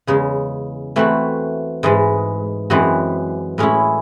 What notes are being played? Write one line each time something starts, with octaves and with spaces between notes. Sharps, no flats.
E2 C#3 G#3
E3 A3 C4 F#4
G#2 E3 G#3
F#2 E3 G#3 C4 F#4
A2 G#3 C#4 E4